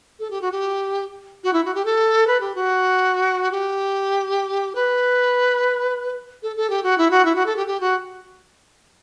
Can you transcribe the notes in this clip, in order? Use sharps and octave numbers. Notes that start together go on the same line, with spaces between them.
A4
G4
F#4
G4
F#4
E4
F#4
G4
A4
B4
G4
F#4
G4
B4
A4
A4
G4
F#4
E4
F#4
E4
F#4
A4
G4
G4
F#4